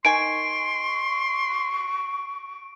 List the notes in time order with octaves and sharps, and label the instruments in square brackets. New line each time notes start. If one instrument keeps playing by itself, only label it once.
[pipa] D#3 G#5 [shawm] C6 [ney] C#6 [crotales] D7